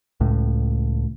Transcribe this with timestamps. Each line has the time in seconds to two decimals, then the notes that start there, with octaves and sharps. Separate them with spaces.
0.20 C#2 A2